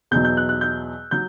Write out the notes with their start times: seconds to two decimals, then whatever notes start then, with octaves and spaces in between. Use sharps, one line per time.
0.11 E2 B2 F#3 G6
0.25 G6
0.37 F#6
0.49 F#6
0.61 G6
1.11 F#3 G6